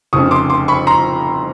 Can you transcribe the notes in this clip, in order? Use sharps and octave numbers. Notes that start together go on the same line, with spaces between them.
F1 F2 C#3 C#6 D#6
C6 D6
C6 D6
B5 C#6
A#5 C6